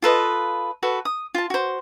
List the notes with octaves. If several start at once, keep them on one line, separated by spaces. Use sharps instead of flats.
F4 A4 B4 D#5
F#4 A4 B4
D#6
F4 A5
F#4 C5